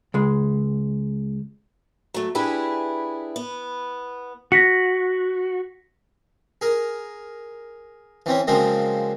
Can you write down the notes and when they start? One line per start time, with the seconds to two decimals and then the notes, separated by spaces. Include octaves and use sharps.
0.14 C#2 G#3
2.14 F#3 A3
2.35 D4 E4 G4 G#4 B4 E5
3.36 B3
4.52 F#4 A#6 B6 C#7
6.61 G#4 A#4
8.26 E3 C4 C#4
8.47 C#3 F3 F#3 G#3 A#3 C4